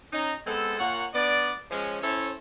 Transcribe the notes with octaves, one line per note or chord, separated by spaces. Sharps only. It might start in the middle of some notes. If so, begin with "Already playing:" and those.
C#4 D#4
G#3 B3 C4 A4
A#2 A#3 C#5 F#5
B3 D4 D5
F3 G#3 C#4
C#4 E4 A4 C5 C#5